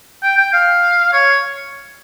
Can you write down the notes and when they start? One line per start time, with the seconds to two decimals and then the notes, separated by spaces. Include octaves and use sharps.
0.23 G5
0.38 G5
0.53 F5
1.13 C#5